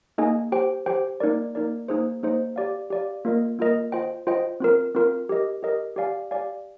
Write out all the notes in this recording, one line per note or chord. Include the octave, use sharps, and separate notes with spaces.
A#3 D#4 G#4 D#5 G#5
G4 C5 G5
G4 C5 G5
A#3 D#4 A#4 D5
A#3 D#4 A#4 D5
A#3 D#4 G#4 C5 D#5
A#3 D#4 G#4 C5 D#5
G4 D5 F5
G4 D5 F5
A#3 F4 A#4 D#5
A#3 F4 A#4 D#5
F4 C5 D#5 G5
F4 C5 D#5 G5
C4 F4 A#4
C4 F4 A#4
G4 A#4 D#5
G4 A#4 D#5
G4 D5 F5 G#5
G4 D5 F5 G#5